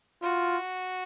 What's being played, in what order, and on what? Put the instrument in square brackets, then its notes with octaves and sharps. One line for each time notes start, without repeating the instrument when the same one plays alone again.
[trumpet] F4 [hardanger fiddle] F#4